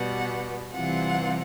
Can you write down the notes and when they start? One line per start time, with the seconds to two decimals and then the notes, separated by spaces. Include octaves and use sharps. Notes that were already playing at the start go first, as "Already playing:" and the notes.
Already playing: B2 G3 B3 F#5
0.74 C3 E3 G3 C4 F4 F#5